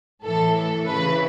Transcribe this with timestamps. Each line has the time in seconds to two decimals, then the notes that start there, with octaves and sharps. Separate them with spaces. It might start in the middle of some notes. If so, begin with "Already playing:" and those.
0.24 A2 E3 A4
0.55 A4
0.85 C#3 E3 B4